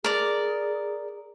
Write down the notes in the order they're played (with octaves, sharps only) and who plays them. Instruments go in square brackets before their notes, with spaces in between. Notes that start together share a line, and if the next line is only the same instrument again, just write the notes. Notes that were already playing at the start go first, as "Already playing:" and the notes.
[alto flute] G#4 [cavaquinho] A#4 D5